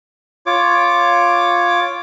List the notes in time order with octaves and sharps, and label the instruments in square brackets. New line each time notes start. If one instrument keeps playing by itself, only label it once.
[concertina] F4 C#5 D6